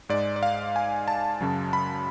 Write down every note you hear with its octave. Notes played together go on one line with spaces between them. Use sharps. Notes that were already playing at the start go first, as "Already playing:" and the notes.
G#2 G#3 D5
D5
F5
G#5
A5
F#2 C#3 F#3
B5